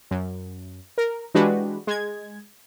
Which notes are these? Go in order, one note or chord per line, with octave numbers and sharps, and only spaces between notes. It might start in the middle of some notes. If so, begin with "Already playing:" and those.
F#2
A#4
E3 G#3 D4 F#4 G4 B4
G#3 G#6